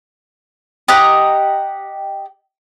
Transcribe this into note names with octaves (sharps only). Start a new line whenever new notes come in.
G4 D#5 F#5 A#5